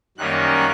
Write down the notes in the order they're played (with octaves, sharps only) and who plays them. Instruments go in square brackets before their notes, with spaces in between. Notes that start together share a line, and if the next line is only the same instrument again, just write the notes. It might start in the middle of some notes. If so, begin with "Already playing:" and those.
[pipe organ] F#2 D#3 G3 A#3 C#4 F#6